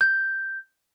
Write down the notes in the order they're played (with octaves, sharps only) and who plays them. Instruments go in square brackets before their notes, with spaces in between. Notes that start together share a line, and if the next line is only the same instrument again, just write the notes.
[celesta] G6